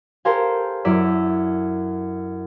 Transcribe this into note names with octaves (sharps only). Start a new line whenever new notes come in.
G4 A4 A#4 C5 F5 G#5
F#2 E4 D5 E6 B6